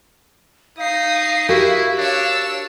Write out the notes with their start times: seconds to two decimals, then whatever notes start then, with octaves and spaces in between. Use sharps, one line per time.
0.78 D#4 F5 D#6 C7
1.49 E4 F#4 G4 A#4
1.98 D4 C#5 E6